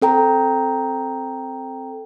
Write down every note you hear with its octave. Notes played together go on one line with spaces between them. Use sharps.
C4 A4 G5 A#5